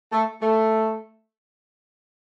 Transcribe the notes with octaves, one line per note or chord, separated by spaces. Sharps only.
A3
A3